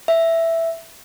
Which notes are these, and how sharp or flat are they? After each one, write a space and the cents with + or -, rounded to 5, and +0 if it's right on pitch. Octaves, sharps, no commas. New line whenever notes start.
E5 +5